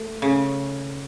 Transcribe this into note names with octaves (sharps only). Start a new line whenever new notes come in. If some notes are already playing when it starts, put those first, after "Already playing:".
Already playing: A3
C#3